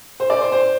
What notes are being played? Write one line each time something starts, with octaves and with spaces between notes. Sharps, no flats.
C5
D5
C5
C5